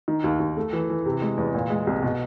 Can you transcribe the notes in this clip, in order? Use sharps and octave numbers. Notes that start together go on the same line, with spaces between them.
D#3
D#2
D#2
A3
E3
E3
C3
G#3
E2
A#2
G#3
C2
B2